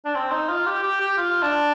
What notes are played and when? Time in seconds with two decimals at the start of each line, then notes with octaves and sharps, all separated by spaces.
0.05 D4
0.15 C4
0.31 D#4
0.49 F4
0.66 G4
0.83 G4
1.00 G4
1.17 F4
1.42 D4